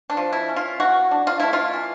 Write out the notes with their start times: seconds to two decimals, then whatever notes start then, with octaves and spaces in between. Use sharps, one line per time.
0.10 D4
0.17 F3
0.33 E4
0.49 C#4
0.56 F4
0.80 E3 F#4
1.11 D4
1.27 F4
1.40 A3 E4
1.53 F4
1.73 E3